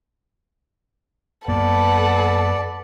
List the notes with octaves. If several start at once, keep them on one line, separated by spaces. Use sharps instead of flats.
F#2 A#3 B3 A4 B4 D5 F#5